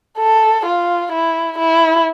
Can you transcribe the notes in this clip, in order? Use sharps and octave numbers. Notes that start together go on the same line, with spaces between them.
A4
F4
E4
E4